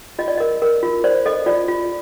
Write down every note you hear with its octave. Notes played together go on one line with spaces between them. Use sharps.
F4 D#5
D5
A#4 D#5
A#4
F4
C5 D5
A4 D#5
F4 D5
F4